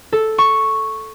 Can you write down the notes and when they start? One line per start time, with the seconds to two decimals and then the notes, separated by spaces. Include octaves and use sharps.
0.12 A4
0.38 C#6